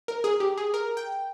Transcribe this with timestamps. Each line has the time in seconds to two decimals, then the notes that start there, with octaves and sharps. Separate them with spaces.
0.08 A#4
0.24 G#4
0.40 G4
0.57 G#4
0.74 A#4
0.97 G5